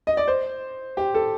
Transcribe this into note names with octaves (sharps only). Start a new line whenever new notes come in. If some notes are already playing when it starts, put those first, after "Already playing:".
D#5
D5
C5
G4
A4